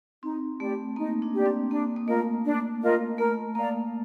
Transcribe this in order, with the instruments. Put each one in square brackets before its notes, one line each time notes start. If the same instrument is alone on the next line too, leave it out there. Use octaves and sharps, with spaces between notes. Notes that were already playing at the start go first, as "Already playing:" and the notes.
[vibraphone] C4 [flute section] D#4
[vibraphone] A3 [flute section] G4 D5
[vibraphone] A#3 [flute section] D#4
[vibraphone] D4
[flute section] G4 D5
[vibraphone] C4
[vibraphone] A#3 [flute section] D4
[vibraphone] A#3
[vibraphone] A3 [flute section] F4 A#4 D#5
[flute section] D4
F4 A#4 D#5
[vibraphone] A3 [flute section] A#4
[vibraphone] A#3 [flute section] D5 F5 A#5